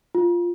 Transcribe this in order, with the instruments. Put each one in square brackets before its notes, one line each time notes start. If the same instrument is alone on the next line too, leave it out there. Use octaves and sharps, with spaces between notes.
[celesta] F4